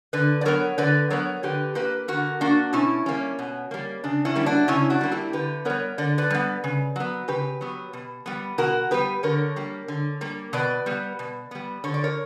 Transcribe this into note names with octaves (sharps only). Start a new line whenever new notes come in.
D3 B4 D5
D5
F#3 B3 A#4 C#5
D3 B4 D5
F#3 B3 A#4 C#5
D3 G4 B4
A#3 G4 B4
D3 F#4 A#4
A#3 D4 F#4
B2 C#4 E4
G3 A#3 C#4
B2
G3 A#3
C#3 D4
C#4 E4
G3 A#3
D4 F#4
C#3 C#4 E4
D4 F#4
G3 A#3
E4 G4
D3 G4 B4
G3 B3 A#4 C#5
D3 D5
B4 D5
G3 B3
C#3
F#3 B3
C#3 G4 B4
F#3 B3
B2
G3 B3
B2 F#4 A#4
G3 B3 G4 B4
D3 A#4 C#5
G3 A#3
D3
G3 A#3
B2 B4 D5
G3 B3
B2
G3 B3
D3 C#5
D5
A#4 C#5